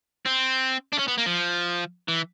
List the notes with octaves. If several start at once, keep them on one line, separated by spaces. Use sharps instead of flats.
C4
D4
C#4
B3
A#3
F3
E3